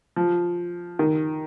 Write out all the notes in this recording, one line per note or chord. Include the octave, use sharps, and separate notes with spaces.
F3
D#3